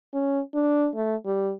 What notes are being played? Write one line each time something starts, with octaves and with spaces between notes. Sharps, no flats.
C#4
D4
A3
G3